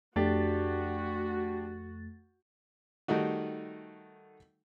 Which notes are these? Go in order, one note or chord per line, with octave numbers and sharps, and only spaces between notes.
F2 A3 D4 F#4 G4 A6
D#3 G3 A3 D#4 F#4